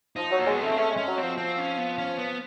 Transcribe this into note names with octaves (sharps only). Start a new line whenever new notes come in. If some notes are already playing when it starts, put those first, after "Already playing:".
F3 D#4
F#3
A#3
G#3 B3
A3 C4
A3 C#4
G#3
C#4
F#3
F3 C4
C4
C#4
B3
C#4
B3